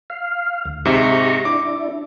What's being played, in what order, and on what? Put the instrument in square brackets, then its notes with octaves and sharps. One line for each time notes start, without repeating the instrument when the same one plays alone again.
[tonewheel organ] F5
D2
[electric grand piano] G#2 C3 E5 [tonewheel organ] G4 A#5 C#6
[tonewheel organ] D4 E4 [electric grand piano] D6